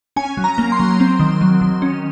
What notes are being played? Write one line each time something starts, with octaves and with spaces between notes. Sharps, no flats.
C#4 G#5
F#3
A#5
A#3
C6
F#3
C4
D#3
F#3
D#3
C#4